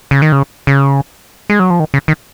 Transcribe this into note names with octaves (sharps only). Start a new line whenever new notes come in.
C#3
D#3
C#3
C#3
G#3
F#3
F3
D#3
C#3
D#3